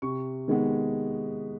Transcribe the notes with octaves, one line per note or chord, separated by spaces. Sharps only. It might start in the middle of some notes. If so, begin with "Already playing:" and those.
C3 C#6
D#3 G#3 B3